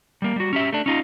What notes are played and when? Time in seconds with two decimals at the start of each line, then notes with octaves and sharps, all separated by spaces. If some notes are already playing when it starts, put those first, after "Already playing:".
0.22 G3 A#3
0.36 G3 F#4
0.53 C#4 G4 E5
0.73 A3 D4
0.86 C#4 D#4 F4